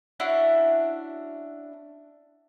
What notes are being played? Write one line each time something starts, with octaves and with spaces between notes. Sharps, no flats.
C#4 D4 E4 F#4